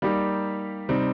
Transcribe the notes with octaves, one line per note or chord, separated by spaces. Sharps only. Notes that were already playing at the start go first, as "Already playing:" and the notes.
G3 A#3 D#4 G4
C3 G3 C4 D#4